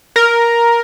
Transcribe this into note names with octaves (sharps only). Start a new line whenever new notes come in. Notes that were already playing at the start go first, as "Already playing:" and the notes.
A#4